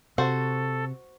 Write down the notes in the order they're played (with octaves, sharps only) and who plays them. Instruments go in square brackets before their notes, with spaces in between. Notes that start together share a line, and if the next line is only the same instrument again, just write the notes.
[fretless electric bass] C3 [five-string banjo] F#4 C5 [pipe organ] A4